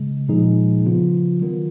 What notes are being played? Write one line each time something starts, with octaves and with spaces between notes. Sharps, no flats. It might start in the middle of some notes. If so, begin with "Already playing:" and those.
Already playing: C#3 G#3
A#2 F3 G#3 D#4 G#4
C#3 F3 B3 F4
D#3 F#3 B3 F4 A#4